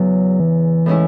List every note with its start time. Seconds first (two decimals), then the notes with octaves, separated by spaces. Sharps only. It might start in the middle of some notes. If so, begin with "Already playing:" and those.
Already playing: E2 C#3 F#3
0.40 E3
0.86 A2 G#3 C#4 E4